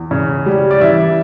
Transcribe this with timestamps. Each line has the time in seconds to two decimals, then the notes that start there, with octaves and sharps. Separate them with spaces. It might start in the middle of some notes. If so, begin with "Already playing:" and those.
Already playing: E2
0.11 C#3
0.46 G3
0.71 D5
0.81 E3 E5